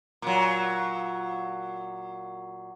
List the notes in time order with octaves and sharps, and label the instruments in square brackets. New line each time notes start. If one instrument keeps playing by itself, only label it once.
[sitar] A#2 F#3